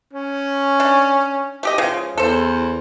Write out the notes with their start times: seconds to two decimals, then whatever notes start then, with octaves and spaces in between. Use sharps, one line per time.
0.13 C#4
0.80 D4
1.63 A3 G4 D#5
1.78 C#3 F3 G#3
2.18 E2 A4 C5